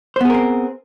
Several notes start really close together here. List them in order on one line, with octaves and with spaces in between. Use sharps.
C5 B3 G#4 A#4 C4